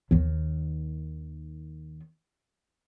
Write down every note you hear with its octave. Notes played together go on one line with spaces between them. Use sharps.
D#2 D#3